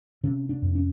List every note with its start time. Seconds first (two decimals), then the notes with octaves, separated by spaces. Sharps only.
0.24 C3 C#4
0.49 D4
0.62 F2
0.75 C#4